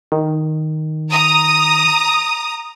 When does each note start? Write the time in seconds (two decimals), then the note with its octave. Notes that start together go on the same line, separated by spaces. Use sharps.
0.12 D#3
1.11 A#5 D#6